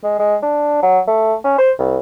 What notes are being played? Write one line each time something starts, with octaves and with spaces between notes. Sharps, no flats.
G#3
G#3
D4
F#3
A3
C#4
C5
C2